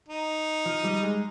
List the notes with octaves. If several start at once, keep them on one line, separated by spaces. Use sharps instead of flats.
D#4
F3
G3
G#3